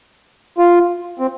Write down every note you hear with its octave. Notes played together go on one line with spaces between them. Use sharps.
F4
C4